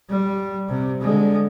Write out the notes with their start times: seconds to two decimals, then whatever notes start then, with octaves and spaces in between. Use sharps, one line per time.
0.10 G3
0.70 C3
1.02 D3 G#3